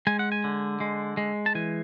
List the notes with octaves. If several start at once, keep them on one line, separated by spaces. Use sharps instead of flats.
G#3 G#5
F#5
G#5
D3
G#3
G#3
A5
E3 G#5